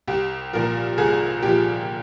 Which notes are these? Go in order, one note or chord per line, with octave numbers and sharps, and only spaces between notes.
C2 G4
A#2 F3 A#4
C2 G#4
A#2 F3 G4